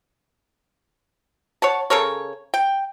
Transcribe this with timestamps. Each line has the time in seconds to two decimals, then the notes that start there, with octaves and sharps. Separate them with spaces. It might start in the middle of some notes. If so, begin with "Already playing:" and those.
1.62 C#5 F#5 A5
1.90 C#3 A4 A#4 C#5
2.54 G5